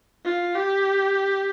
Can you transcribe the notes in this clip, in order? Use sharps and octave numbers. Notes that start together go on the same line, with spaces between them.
F4
G4